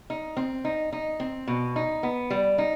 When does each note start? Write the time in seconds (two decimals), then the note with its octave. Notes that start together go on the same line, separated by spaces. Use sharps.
0.10 D#4
0.37 C4
0.65 D#4
0.93 D#4
1.20 C4
1.48 B2
1.76 D#4
2.03 B3
2.30 G3
2.58 D#4